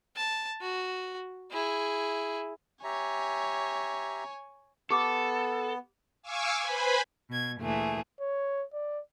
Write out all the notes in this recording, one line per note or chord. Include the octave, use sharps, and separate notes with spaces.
A5
F#4
E4 G#4
G4 C#5 E5 G#5 A#5
B3 G4 A4 D6
F5 G#5 C#6 D6 E6
B4 C5 G#5 B5
B2 G#6
D2 A#2 E3 A3 G#4
C#5
D5